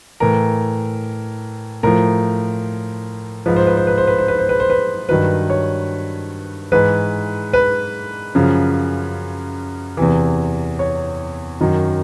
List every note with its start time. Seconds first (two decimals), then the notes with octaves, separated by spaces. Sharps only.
0.20 A2 E3 A#4
1.83 A2 F3 A#4
3.46 G#2 F3 B4
3.56 C5
3.67 B4
3.77 C5
3.87 B4
3.98 C5
4.07 B4
4.18 C5
4.28 B4
4.39 C5
4.49 B4
4.60 C5
4.70 B4
5.09 G2 D#3 F#3 B4
5.50 C#5
6.72 G#2 E3 B4
7.53 B4
8.35 F#2 C#3 F3
9.97 E2 C3 E3
10.79 C#5
11.60 F#2 D#3 F#3